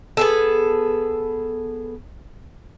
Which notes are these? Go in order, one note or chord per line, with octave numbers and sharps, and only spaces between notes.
B3 G#4 A4